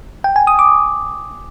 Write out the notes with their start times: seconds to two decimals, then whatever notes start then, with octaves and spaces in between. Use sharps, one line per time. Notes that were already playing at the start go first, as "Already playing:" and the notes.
0.24 G5
0.36 G#5
0.47 D#6
0.59 D6